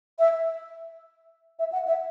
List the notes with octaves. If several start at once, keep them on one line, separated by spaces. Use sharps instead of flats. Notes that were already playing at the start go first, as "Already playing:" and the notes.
E5
E5
F#5
E5